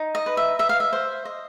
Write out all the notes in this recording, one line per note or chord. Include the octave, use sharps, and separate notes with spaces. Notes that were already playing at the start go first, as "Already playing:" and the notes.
Already playing: D#4
D#5
B4
E5
D#5 E5
F5
E5
C5
D#5